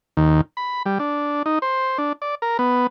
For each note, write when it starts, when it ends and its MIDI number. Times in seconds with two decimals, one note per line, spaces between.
0.17 0.41 39
0.57 0.83 83
0.86 0.98 55
0.99 1.43 62
1.46 1.59 63
1.62 1.98 72
1.98 2.13 62
2.22 2.35 74
2.42 2.57 70
2.59 2.87 59